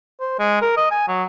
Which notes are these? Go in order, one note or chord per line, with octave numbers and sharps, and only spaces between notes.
C5
G#3
A#4
D#5
G#5
F#3